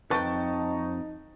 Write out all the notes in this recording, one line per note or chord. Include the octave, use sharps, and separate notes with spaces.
F2 D#4 B4 G5 A5 C#6 A6